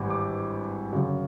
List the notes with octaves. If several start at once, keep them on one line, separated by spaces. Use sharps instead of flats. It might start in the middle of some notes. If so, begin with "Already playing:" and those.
Already playing: G#1 G2 E3
D6
G1 F#2 C#3